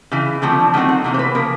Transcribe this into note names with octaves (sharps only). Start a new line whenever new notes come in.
C#3 E3
D3 F3 A3 C4
D#3 F#3 A3 C4
F#5
C3 E3 A#3
C5
B4
C#3 F3 A#3 A#4